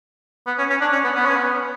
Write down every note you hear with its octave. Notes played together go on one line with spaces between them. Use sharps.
B3
C#4
C#4
D4
C#4
B3
B3
C#4
B3